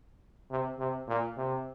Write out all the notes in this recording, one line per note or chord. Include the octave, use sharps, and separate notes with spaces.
C3
C3
A#2
C3